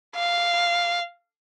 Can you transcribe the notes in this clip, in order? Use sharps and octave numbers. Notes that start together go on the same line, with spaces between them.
F5